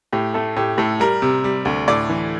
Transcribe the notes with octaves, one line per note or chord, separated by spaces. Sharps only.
A2 G4
A3 A4
A2 G4
A2 A4
G3 A#4
C3
G3
D2
A2 D5
E3